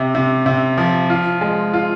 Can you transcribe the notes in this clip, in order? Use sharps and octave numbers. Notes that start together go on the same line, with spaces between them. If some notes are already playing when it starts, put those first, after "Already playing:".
Already playing: C3
C3
C3
F3
F4
G#3
F4